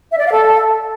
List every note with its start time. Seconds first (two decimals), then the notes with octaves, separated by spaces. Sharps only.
0.12 E5
0.18 D5
0.25 F5
0.32 A4